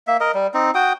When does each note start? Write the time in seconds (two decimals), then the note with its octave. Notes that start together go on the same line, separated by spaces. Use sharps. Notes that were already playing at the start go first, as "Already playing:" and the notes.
0.07 A#3 E5
0.21 A#4 D#5
0.35 G3
0.54 C4 D#4
0.75 F#4 G5 D#6